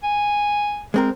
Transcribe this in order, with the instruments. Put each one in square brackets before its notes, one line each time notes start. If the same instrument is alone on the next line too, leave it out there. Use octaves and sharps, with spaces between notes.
[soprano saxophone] G#5
[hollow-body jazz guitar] G#3 C4 A#4